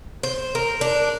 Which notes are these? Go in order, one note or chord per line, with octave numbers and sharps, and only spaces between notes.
C5
A#4
D4